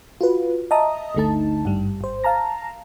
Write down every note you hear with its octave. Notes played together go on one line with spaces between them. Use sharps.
F4 F#4 B4
D#5 E5 A5 A#5 D#6
G1 D2 D3 A3 D#4 A5
G#1 G2 G3
G#1 C5
F5 A5 A#5 A#6